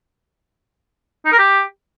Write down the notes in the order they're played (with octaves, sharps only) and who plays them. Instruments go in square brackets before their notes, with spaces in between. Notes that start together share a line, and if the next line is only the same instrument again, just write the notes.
[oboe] D#4
A#4
G4